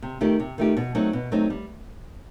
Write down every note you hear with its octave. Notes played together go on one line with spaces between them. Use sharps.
C3
D#3 A3 D#4 G4
C3
D#3 A3 D#4 G4
B2
F#3 A3 C4 D#4
B2
F#3 A3 C4 D#4
G3